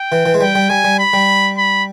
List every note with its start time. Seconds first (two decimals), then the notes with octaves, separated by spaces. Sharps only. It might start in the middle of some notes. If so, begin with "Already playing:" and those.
Already playing: G5
0.12 E3
0.26 E3
0.34 G#3
0.40 G3 G5
0.55 G3
0.70 G3 G#5
0.84 G3
0.99 B5
1.13 G3
1.58 B5